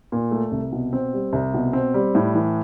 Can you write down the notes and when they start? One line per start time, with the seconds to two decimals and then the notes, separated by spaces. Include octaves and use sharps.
0.12 A#2
0.31 A3
0.52 C2
0.72 B2
0.93 C4
1.14 G3
1.33 C2
1.54 B2
1.73 C4
1.94 G3
2.15 A2
2.34 E3